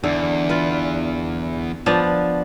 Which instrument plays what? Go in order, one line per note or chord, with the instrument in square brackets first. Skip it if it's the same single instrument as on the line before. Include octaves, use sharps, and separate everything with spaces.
[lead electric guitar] E2 [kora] D3
[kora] F4 B4
F3 B3 D4